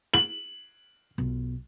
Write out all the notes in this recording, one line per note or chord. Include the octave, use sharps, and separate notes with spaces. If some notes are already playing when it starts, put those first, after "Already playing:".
F#7
B1 F4